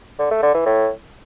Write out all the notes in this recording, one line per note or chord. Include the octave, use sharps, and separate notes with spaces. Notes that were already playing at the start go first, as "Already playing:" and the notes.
D3
A3
D3
E3
A2